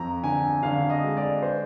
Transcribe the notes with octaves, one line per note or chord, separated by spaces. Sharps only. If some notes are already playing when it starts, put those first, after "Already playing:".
Already playing: F2 A#5
D3 G#5
D3 F5
D#5
G#3
D5
C5